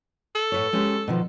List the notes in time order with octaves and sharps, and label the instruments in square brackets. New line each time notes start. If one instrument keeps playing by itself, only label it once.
[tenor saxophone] A4
[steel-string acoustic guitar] A2 B4 C#5
G#3 C#4 G4
B2 D#3 F3